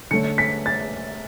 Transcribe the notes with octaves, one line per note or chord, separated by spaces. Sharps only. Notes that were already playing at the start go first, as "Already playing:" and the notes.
D3 A3 C#4 C#7
B6
A6